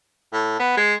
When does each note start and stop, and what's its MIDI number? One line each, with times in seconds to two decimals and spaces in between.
0.33 0.58 45
0.59 0.73 59
0.77 0.94 56